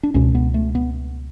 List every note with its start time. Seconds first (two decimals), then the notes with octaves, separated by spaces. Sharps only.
0.03 D4
0.14 C#2 B2 C#4
0.35 B3
0.54 A3
0.75 B3